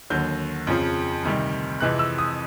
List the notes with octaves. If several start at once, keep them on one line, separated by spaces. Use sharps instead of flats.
D#2 D3 F#3 G6
F2 C#3 F3
D2 C3 D#3 G3
F2 C3 E3 G#3 F#6
E6
D#6